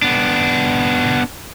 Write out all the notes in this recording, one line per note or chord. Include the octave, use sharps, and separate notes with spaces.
B3 D4